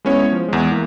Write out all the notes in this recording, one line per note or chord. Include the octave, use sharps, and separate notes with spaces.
G#3 B3 C#4 E4 C#5
F3
E2 G#3
E3 A#3